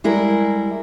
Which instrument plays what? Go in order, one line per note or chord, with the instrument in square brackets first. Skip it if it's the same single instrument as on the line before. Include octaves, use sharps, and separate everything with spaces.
[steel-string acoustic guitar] G3 G#3 E4 A#4